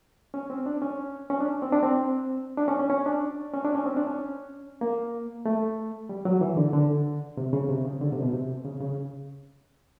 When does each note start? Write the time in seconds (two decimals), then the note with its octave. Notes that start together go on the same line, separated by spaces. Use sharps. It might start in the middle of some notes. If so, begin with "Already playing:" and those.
0.34 C#4
0.50 C4
0.66 D4
0.82 C#4
1.30 C#4
1.40 D4
1.62 C4
1.73 D4
1.83 C4
2.57 D4
2.68 C#4
2.79 C#4
2.90 C#4
3.06 D4
3.54 C#4
3.64 D4
3.75 C#4
3.86 C4
3.97 D4
4.07 C#4
4.81 A#3
5.46 A3
6.09 G3
6.25 F#3
6.41 E3
6.57 D3
6.73 D3
7.37 C3
7.53 C#3
7.69 C3
7.85 C#3
8.01 D3
8.12 C3
8.22 B2
8.33 C3
8.65 C#3
8.81 C#3